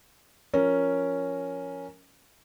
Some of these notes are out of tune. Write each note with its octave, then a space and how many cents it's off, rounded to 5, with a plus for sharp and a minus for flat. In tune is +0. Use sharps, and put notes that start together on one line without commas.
F3 +0 C#4 +0 A#4 +0